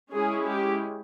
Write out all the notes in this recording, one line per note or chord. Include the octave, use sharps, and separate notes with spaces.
G#3 C#4 E4 G#4
G4